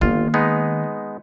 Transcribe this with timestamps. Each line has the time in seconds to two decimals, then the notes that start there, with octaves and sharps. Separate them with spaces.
0.01 G1 D#3 A#3 F4
0.34 G#3 B3 D#4